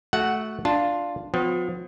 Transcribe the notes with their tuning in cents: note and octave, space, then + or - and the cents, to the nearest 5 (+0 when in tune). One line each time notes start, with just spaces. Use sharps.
A3 -20 F#4 +0 F#5 +0
D4 +0 F4 +0 A5 +0
F3 +40 B3 +45